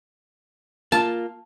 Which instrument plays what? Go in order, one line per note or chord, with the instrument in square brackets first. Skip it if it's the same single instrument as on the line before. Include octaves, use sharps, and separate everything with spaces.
[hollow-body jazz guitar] A#3 F4 [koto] A5